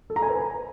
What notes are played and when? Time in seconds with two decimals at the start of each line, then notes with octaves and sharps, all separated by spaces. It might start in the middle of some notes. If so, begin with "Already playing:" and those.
0.10 A4
0.16 A#5
0.23 G#5
0.29 B4